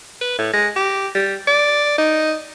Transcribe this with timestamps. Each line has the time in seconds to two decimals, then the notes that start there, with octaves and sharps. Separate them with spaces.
0.21 B4
0.38 A2
0.54 G#3
0.76 G4
1.15 G3
1.48 D5
1.98 D#4